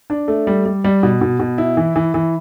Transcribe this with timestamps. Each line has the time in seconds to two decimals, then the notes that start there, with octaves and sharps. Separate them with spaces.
0.10 D4
0.28 A3
0.47 G3
0.66 G3
0.84 G3
1.03 B2
1.21 B2
1.40 B2
1.58 E4
1.77 E3
1.96 E3
2.14 E3